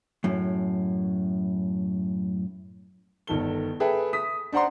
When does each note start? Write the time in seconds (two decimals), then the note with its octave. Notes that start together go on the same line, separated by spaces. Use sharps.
0.24 F#2 A2
3.27 G1 D#3 A4 G7
3.80 G#4 A4 B4 E5 G5
4.13 D#6 B6
4.53 D4 C5 F#5 A#5 C6